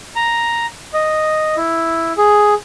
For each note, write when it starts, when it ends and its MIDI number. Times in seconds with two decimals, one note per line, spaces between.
0.16 0.66 82
0.94 1.56 75
1.57 2.13 64
2.18 2.54 68